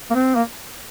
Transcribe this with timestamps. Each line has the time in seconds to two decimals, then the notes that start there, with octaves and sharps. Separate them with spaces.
0.11 A#3
0.15 C4
0.36 A#3